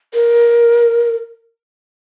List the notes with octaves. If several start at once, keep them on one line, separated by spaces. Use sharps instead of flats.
A#4